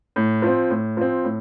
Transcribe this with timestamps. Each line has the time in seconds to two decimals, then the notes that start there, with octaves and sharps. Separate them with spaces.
0.16 A2
0.42 F3 C4
0.70 A2
0.97 F3 C4
1.24 A2